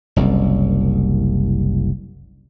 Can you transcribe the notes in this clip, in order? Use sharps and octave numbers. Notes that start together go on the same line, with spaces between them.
F#1 C2